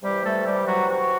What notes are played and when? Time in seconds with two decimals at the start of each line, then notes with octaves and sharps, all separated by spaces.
0.03 C3 E3 G3 G4
0.24 A3 A4
0.46 G3 G4
0.67 F#3 F#4
0.89 F#3 F#4